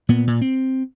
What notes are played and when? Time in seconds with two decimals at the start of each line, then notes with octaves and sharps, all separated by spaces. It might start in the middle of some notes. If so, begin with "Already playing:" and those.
0.09 A#2 B3
0.27 A#2
0.41 C4